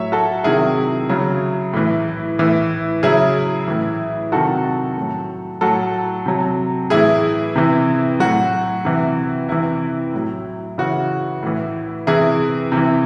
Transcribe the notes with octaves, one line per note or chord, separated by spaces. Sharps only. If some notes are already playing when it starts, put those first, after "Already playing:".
Already playing: A2 F#3 C#5 E5
F#4 A4
C3 D#3 F#3 E4 G#4
C#3 F#3
A2 E3
A2 E3
C#3 F#3 E4 G#4
A2 E3
C3 D#3 F#3 F#4 A4
A2 F#3
A2 F#3 F#4 A4
C3 F#3
A2 E3 E4 G#4
C3 E3
A2 F#3 F#4
C3 E3
C3 E3 E4
A2 F#3
C#3 E3 F#4
A2 E3
C3 E3 E4 G#4
C3
E3